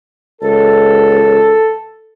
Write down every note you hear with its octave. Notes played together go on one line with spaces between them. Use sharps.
C#2 A4